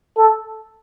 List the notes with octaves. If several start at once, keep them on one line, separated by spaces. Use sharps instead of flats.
A4